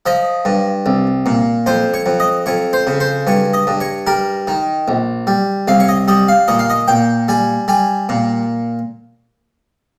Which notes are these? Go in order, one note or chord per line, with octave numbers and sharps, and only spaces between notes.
F3 D#5
G2
C2
A#2
F2 C5
C#5
F2
D#5
F2 C#5
C5
C#3
C5
G2 C#5
D#5
G2
C#5
G3 A#4
D#3
A#1
G3
C2 F5
C#5
D#5
G3 D#5
F5
A#2 D#5
F5
D#5
A#2 G5
G3 G#5
G3 G#5
A#2